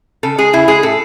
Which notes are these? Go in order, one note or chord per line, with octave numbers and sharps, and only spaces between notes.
C#3 A4
G#3 G#4
C#3 E4
G#3 G#4
A2 A4